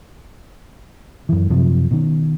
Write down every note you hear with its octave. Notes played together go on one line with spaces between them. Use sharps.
F#2 E3
F#2 C3 F3
B2 D#3